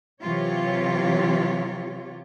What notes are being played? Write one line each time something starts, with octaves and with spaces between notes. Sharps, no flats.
C3 E3 F#3 F4 G4 C#5